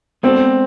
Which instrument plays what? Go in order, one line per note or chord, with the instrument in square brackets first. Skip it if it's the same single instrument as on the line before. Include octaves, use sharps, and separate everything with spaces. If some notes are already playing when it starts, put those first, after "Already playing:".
[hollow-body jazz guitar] G#3 B3 D4 F#4 A4 [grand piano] C4